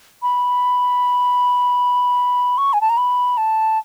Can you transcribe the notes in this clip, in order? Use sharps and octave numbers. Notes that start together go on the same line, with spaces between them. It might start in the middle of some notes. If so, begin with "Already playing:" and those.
B5
C#6
G#5
A5
A#5
B5
A5